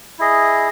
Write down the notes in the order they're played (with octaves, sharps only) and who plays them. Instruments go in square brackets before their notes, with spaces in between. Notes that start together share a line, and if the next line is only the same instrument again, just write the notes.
[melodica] E4 G#4 D#5